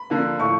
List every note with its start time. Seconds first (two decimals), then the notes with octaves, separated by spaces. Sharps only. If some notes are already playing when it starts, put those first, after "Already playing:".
Already playing: B5
0.10 D3 F3 A#3
0.40 A2 F3 A3 C#6